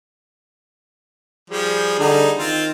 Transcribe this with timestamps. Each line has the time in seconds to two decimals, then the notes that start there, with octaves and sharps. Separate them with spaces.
1.50 F3 G3 G#4
1.99 D3 G3 D#4
2.38 D#3 C4 F4